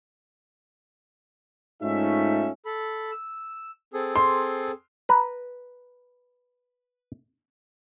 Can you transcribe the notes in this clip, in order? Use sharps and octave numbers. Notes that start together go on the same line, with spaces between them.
G#2 A3 C#4 D#4 F4 E5
A4 B5
E6
C4 G#4 A4
C6
B4 A#5